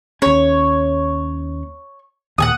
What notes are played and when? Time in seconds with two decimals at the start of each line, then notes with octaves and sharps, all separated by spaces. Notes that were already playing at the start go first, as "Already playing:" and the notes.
0.22 D#2 C#4 C#5
2.38 D#2 A#2 F#5 G#5 D#6